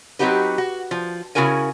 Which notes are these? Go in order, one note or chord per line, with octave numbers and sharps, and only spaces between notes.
F#3 C4 D#4 F#4 G4 B4
F#4
F3
C#3 E4 F#4 A#4 G#5